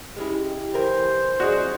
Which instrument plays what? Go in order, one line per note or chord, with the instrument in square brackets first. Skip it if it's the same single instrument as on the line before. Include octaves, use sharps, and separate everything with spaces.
[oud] G#3 C#4 E4 [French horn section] G4
[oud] E3 E4 A#4 [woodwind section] C5
[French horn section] C3 F#3 E4 [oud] D4 C#5 D#5 [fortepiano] F#4 G#4